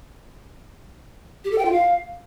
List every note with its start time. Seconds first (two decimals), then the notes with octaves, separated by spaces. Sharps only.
1.44 G4
1.51 A4
1.58 G5
1.65 F4
1.72 F5